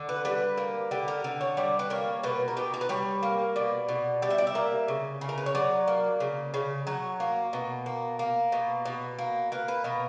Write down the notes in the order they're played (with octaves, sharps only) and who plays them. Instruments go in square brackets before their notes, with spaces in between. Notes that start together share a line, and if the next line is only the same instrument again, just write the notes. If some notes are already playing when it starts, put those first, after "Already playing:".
Already playing: [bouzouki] D3
B4
G3 B4
A#3
D3 G4
A#4
D3
C#5
G3 D5
B4
A#3 C#5
B2 B4
A#4
B2 G4
A#4
B4
G3 C#5
A#3
B2 D5
B2
G3
E5
D5
E5
A#3
C#3
C#3
A#4
B4
C#5
F#3 D5
A#3
C#3
C#3
F#3 C#5
A#3
B2
A#3
A#3
B2
B2
A#3
A#3 B4
B4
B2 A#4